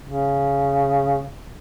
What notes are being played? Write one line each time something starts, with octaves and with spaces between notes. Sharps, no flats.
C#3